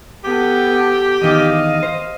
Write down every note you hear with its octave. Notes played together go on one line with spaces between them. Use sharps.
B3 G4 A4
E2 D#3 D#5 F5
C5